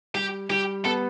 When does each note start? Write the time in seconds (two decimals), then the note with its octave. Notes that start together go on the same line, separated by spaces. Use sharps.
0.15 G3 G4
0.50 G3 G4
0.85 B3 A4